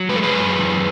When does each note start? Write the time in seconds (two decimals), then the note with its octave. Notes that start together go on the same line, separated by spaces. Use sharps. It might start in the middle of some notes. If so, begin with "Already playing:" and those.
Already playing: F#3
0.09 G#3 B4
0.16 A4
0.23 G#4 B4
0.34 F#2
0.58 E3